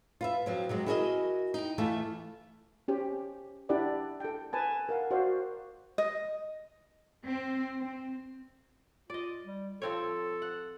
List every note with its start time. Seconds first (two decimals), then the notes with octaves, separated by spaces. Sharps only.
0.21 F4 B4 E5
0.46 F3 F#3 C4
0.69 C3 F#3 G#3
0.86 E4 F#4 G#4 A#4 C5 D#5
1.54 D#4 G5
1.78 E3 A3 F4 E5 A5
2.88 C#4 G4 C5
3.69 D4 E4 G4 B4 D5 F#5
4.20 A4 G5
4.53 B4 G#5 A5
4.89 A#4 F5 F#5
5.11 F#4 A#4 C5 D5 F5 F#5
5.98 D#5
7.25 C4
7.80 C4
9.10 F4 D5 D#5
9.44 G3
9.82 F3 C4 A4 C#5
10.42 F#5